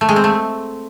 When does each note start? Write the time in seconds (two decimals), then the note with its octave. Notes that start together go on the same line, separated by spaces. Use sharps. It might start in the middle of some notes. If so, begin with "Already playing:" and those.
0.01 A3
0.09 G#3
0.16 C4
0.24 A3